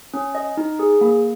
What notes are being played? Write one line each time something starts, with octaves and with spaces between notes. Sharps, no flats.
C#4
D#5
D#4
G#4
A#3